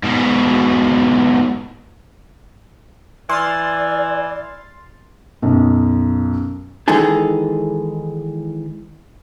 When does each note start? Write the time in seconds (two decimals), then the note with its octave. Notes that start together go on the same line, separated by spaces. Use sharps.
0.03 G#2 B2
3.29 E3 D5 C6 F6 A6
5.42 B1 F#2
6.88 D#3 E3 G#3 D#4 G#4 A4